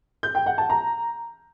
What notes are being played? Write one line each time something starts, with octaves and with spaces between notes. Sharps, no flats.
G6
G5
F#5
A5
A#5